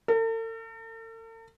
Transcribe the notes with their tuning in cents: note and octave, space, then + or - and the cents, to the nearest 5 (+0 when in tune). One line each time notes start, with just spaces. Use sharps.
A4 +45